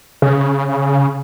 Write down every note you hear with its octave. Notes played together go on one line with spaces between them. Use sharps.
C#3